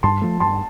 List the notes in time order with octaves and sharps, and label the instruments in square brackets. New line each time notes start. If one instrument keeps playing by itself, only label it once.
[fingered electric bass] G2 [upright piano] A5 C6
[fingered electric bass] F3 A3
[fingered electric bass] G2 [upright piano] A5 C6